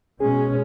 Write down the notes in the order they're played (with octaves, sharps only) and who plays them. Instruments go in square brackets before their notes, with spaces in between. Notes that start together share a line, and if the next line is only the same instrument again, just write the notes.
[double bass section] B2 G#3 C#4 [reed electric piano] G#4